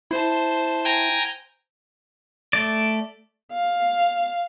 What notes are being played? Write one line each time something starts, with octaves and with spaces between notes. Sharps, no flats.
E4 C5 A5
G5 G#5 A#5
A3 D5
F5